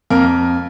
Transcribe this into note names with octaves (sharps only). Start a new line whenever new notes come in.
F2 A#3 A#4